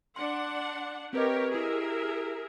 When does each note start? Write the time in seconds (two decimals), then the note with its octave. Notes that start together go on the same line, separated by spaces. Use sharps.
0.16 D4 F#5 C6
1.13 C4 G4 A#4 B4 C#5 D#5
1.52 E4 G4 G#4 A#4 E5